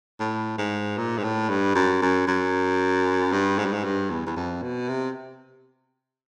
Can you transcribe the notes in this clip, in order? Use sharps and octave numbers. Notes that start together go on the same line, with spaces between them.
A2
G#2
A#2
G#2
A2
G2
F#2
F#2
F#2
G2
G#2
G2
G#2
G2
E2
E2
F2
B2
C3